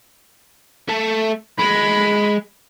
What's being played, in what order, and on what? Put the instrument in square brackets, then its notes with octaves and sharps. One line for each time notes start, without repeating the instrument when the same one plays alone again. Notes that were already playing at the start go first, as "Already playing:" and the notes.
[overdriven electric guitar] A3 A4
[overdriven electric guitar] G#3 [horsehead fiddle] B5